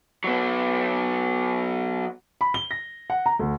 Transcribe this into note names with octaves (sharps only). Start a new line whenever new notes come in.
F#3 B3
B5
G7
A#6
F#5
A#5
D2